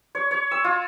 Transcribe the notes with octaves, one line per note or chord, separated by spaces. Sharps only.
C#5
C#5
E6
F4